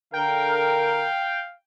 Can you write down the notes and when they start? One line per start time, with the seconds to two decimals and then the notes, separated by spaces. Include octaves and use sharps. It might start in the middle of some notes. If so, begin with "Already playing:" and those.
0.14 D3 A#4 F5 G5